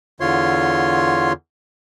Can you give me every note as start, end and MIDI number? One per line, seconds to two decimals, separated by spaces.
0.20 1.33 40
0.20 1.33 50
0.20 1.33 65
0.20 1.33 73
0.20 1.33 84